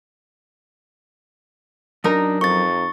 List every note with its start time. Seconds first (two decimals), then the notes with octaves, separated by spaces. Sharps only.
2.04 F#2 D4 D#4 A#4
2.41 F2 C#6 A6